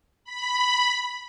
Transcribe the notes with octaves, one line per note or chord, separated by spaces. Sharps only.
B5